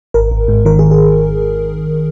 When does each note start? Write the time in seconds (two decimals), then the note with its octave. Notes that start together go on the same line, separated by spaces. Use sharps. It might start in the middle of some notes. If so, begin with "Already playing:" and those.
0.14 G#1 A#4
0.31 G#1
0.48 G#2
0.65 D#3 A#4
0.79 G#4
0.91 G#4